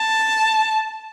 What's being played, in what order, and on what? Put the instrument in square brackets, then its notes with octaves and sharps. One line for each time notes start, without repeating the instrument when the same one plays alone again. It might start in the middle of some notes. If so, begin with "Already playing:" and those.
Already playing: [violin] A5